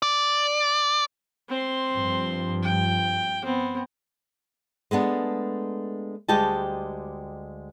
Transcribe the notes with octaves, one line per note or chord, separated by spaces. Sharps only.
D5
C4 C6
G2 F3
G5
B3 C4
G#3 A3 B3 D4
D2 G3 G#3 G4 D#5 A5